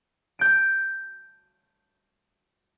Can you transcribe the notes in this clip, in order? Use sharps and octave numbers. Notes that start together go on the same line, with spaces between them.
G6 D7